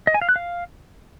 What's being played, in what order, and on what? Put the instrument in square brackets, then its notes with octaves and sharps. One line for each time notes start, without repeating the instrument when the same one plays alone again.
[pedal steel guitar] D#5
G#5
F5
F#6
F5